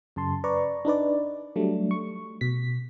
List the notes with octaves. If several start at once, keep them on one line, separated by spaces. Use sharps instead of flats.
F#2 C#3 A5 C6
B4 D5 A#5 C#6
D4 D#4 B4 D5
F#3 G3 A3 D4
C#6
B2 B6